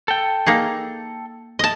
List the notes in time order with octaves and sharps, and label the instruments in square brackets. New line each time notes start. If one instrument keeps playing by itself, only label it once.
[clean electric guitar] A4 G5
[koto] A#3 D#4 G#4
D#5 A5